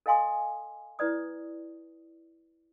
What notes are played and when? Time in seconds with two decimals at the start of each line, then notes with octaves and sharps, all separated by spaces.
0.06 A4 D#5 F5 G#5 C6 D#6
0.99 E4 B4 D5 D#6